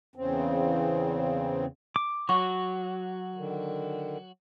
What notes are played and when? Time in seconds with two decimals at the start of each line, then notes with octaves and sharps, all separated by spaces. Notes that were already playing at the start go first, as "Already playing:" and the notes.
0.16 E2 C#3 C4
1.96 D6
2.29 F#3 F#4 C#6
3.35 D3 D#3